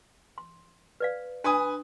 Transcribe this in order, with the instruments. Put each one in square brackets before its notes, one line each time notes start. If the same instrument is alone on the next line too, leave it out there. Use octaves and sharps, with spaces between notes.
[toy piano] C6
B4 D5 F5
[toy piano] D4 C6 [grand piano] B4 G#5 D#6